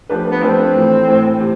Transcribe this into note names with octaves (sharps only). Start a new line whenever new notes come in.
F3 A3 D4 G4 B4
B3
F3 A3 C4 D4 G4 B4
A2 E3 A3
A2 E3 A3
C3 C4